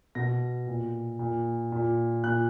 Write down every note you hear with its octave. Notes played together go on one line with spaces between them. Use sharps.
B2 A#6
A#2
A#2
A#2
A#2 F#6